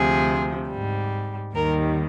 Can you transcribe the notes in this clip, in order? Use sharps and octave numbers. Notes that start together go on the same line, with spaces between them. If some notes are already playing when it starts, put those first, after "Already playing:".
Already playing: D2 C3 F3 G#4
G#2 G3
D#2 D#3 G3 A#4